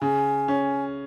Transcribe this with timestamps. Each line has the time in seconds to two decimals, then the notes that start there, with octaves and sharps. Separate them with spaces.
0.01 C#3 G#5
0.48 C#4